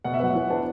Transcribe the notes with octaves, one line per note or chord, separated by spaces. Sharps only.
B2 F#5
E5
F#3 B3 F#5
E3
B3 D4